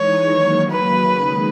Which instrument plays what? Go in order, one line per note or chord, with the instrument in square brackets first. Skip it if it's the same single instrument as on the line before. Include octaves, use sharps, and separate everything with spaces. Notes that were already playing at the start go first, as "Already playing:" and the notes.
Already playing: [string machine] E3 G#3 D#4 [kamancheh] C#5
[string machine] D#3 F#3 A#3
[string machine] C#3 F#3 A#3 [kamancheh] B4
[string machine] D#3 G#3 D#4 G#4